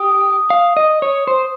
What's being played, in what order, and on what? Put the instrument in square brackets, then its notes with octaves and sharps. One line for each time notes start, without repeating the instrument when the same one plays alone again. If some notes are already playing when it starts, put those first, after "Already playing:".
Already playing: [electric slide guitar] G4 [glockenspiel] D#6
[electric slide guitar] F5
D#5
C#5
C5